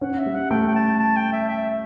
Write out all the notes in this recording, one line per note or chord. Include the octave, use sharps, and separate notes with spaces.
C#4 F#5
E5
G3
F#5
A3 G5
G5
A5
A5
G5
E5
E5